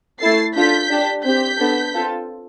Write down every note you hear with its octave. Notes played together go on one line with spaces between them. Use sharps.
A3 E4 A4 A6 C7
D4 F4 A4 G6 B6
D4 G4
C4 G4 G6 B6
B3 D4 A4
C4 F4 A4